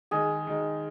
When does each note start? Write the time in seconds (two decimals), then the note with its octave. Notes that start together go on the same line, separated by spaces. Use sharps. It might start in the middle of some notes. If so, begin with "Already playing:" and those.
0.11 D#3 G#3 D#4 G#4
0.47 D#3 G#3 D#4